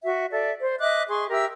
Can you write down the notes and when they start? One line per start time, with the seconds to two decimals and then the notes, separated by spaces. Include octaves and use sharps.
0.04 F#4 E5
0.31 A4 D5 E5
0.60 C5
0.79 D#5 E5 D6 F#6
1.09 G#4 C6 C#6
1.31 G4 A#4 E5 E6